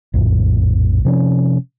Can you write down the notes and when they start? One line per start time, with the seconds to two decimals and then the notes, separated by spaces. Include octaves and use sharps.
0.14 A#1 F2 A2
1.05 C3 F3 C4 C#4